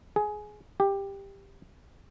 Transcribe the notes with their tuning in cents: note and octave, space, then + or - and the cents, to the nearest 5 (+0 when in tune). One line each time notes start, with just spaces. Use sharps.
G#4 +15
G4 +10